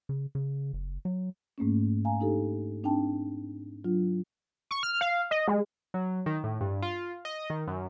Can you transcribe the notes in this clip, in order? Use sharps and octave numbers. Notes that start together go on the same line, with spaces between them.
C#3
C#3
F#1
F#3
G#2 A3 A#3 C#4
F5 G#5 A#5
D4 D#4 G4 A4
C4 D4 D#4 G5 A5
F#3 D4 F4
C#6
F6
F5
D#5
G#3
F#3
D#3
A2
G2
F4
D#5
D#3
F#2